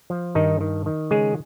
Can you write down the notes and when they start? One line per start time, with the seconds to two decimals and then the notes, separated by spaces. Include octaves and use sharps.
0.10 F3
0.35 G2 D#3 D#4
0.61 D#3
0.86 D#3
1.11 C#3 G#3 G#4